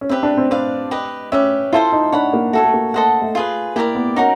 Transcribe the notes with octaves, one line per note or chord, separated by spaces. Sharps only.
C#4
C4 G4 B4 E5
D4
C4
C4 B4 D5 F5
G4 B4 D#5
C#4 G4 B4 E5
E4 F4 A4 C5 F5
D#4
D4 C#5 F#5 B5
A#3
A3 F#4 A4 C#5
A3
A#3
A3 A4 C5 D#5 F#5
A3
F4 G#4 B4
A#3 E4 G4 A#4 D5
B3
C#4 D#4 F#4 A#4